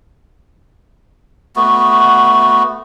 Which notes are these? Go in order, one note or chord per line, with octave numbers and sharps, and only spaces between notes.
A3 B3 F#4